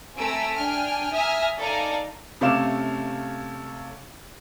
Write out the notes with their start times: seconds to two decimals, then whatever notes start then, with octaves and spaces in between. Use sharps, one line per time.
0.16 A3 C4 G#5 A#5 E6 D7
0.58 D4 G5 G#5 F6
1.14 E5 G#5 A#5 D#6 F6
1.59 D#4 A4 D5 F5 G#5 A#5
2.41 C3 A3 C#4 F5 D6 E7